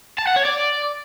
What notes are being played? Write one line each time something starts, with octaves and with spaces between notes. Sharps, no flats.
A5
F#5
C#5
D5